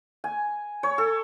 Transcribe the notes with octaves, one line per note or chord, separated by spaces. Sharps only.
G#5
C#5
A4